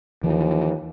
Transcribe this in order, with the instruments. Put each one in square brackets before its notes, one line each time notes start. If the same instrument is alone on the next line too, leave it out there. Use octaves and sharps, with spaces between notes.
[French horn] D#2 [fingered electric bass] E3 F3